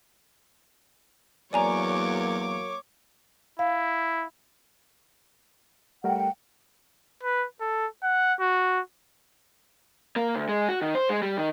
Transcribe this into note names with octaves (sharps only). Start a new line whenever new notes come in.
E2 F#3 A#3 C#5 D5 G#5 A#5 D6
E4 F5
G3 A3 A#4 F#5 G5
B4
A4
F#5
F#4
A#3
D2
G#3
F#4
D#3
C5
G#3
G3
D#3